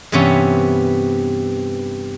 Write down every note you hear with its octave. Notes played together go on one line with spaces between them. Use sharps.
G2 C3 E3 B3 C#4